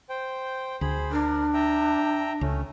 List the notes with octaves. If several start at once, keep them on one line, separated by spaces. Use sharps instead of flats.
C5 G5
D2 G#4 C5 B5
D4 A#4
E5 G5 A#5
C#2 A3 C#4